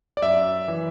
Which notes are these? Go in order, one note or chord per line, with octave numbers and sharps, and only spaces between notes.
D5
F#2 E5
E3